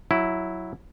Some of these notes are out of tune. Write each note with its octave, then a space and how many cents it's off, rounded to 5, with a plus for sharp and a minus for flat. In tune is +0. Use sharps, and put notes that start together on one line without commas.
F#3 +0 E4 +0